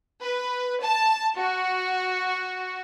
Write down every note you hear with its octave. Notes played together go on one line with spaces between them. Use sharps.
B4
A5
F#4